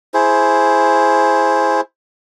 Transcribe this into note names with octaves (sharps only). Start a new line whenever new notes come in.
E4 G#4 C5